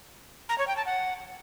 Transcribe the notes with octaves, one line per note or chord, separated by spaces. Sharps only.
A#5
C#5
G5
A5
F#5